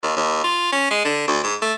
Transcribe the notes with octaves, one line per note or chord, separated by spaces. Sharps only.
D#2
D#2
F4
C#4
G#3
D3
D2
G#2
A3